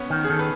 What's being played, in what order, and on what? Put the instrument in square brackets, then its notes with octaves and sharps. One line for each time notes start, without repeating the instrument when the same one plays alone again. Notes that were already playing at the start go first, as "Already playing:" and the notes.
Already playing: [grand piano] B3 C#4
[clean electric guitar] D#3
[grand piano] G#4
[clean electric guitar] D#3 [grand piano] A4
[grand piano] B4